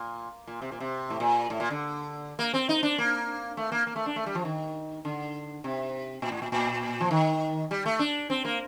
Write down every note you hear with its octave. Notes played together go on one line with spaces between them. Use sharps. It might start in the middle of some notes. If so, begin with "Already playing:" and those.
Already playing: A#2
A#2
C3
A#2
C3
A2
A#2
A2
A#2
D3
A#3
C4
D#4
D4
A#3
A3
A#3
A#3
A3
D4
A3
G3
F3
D#3
D3
C3
A#2
A2
A#2
A#2
F3
D#3
G3
A3
D4
C4
A#3